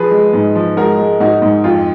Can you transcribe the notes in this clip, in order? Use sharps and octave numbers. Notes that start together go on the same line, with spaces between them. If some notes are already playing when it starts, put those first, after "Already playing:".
Already playing: F3 G#4 B4
G#3
G#2
F3
G#3 F#4 A#4
G#3
G#2 D#4 F#4
G#2
F2 F4